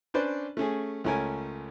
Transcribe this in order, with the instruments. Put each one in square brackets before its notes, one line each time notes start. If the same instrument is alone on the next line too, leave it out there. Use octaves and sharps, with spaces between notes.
[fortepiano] C#4 D4 B4 C5 D5
A3 C#4 G#4
C#2 A3 C#4 A#4 G#5